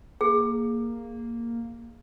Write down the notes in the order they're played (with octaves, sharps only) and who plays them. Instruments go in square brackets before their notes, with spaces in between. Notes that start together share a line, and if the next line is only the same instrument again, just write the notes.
[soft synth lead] A#3 [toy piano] G#4